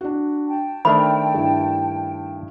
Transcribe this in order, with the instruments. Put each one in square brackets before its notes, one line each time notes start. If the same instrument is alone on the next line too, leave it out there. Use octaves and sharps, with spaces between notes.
[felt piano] D4 F#4
[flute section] G5 A5
[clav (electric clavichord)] D#3 A3 D4 [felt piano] C5 E5 F6 [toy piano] B5
[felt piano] G2 E4